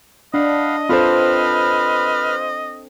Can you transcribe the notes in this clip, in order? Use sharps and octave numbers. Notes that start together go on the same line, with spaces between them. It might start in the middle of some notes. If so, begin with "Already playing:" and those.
D4 D#5 F5 F#5 B5
C4 F4 A4 B4 C5 B5 F6